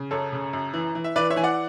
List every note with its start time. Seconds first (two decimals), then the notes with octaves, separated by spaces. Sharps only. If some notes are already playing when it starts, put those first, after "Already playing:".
Already playing: C#3
0.11 F#2 A4 C#5
0.32 C#3
0.53 F#2
0.73 E3
0.95 E3
1.04 E5
1.16 E3 B4 D5
1.30 C#5 E5
1.36 E3 G#5
1.44 D5 F#5